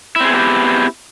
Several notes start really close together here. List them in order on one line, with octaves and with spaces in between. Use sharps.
E4 C4 G#4 B3 G4